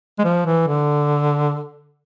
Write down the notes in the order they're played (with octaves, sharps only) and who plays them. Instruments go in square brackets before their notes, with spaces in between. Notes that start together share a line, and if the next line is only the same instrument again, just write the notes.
[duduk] G#3
F3
E3
D3